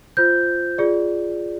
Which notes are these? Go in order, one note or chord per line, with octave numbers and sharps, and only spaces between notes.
F4 C5 G6
F4 G#4 D5